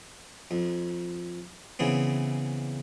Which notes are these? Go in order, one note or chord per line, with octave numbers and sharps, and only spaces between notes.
F2
C#3 E3 B3 C4